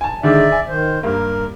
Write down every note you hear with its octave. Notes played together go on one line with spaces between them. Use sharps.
G#5 A5
D3 D#3 G#3 D5 E5
G#5
D#3 C5
G2 A#3 A#4